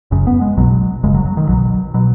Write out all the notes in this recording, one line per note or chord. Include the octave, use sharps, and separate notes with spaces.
F#1 F#2 C#3
B3
G#3
B1 B2 F#3
F#1 F#2 C#3 G#3
F#3
F#3
D#3
B1 B2 F#3
B2 F#3